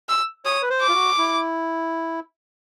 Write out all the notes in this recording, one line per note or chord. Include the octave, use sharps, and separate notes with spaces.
E6
C#5 D#6
B4
C5
D6
F4
F#4
E4